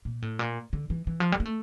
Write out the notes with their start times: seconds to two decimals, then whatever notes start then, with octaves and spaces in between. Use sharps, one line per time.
0.05 A#2
0.22 A2
0.39 A#2
0.73 D3
0.90 E3
1.07 E3
1.20 F3
1.32 G3
1.40 A#3
1.45 A3